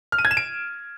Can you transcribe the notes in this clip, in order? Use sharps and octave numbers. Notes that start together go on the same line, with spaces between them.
F6
D#7
G#6
E7
D7